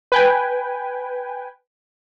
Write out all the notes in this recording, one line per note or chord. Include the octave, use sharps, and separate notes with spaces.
B4 G5 G#5